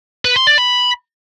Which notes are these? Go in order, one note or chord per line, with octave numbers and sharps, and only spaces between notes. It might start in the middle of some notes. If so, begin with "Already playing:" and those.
B4
C6
D5
B5